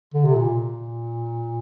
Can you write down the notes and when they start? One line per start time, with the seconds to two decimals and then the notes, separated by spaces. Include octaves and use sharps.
0.14 D3
0.25 C3
0.35 A#2